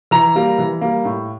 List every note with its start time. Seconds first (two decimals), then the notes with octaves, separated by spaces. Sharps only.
0.11 E3 A#5
0.35 G3 A#3
0.59 E3
0.81 G3 A#3
1.05 A2